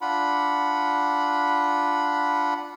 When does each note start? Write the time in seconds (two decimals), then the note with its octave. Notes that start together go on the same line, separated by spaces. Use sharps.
0.01 D4 F4 F#5 B5